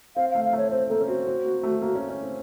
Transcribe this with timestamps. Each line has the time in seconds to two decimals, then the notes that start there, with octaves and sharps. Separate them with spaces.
0.16 C4 F5
0.31 A3 F5
0.44 F5
0.53 A3 C#5
0.71 C4 C5
0.89 A#3 A4
1.00 C#4
1.08 C4 F#4
1.27 C4
1.45 A#3
1.63 A3
1.82 A#3
1.95 C#4
2.09 C#4
2.23 C4